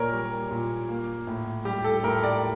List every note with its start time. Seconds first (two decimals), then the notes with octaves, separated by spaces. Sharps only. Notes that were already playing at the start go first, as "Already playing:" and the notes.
Already playing: A#2 A#3 A#4 C#5 D5
0.12 G3
0.51 A#2
0.89 A#3
1.27 A2
1.65 G3 G4
1.84 A4
2.03 A2 A#4
2.24 D5